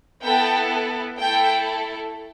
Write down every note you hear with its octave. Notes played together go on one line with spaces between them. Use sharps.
B3 E4 A4 G5
A3 E4 A4 G5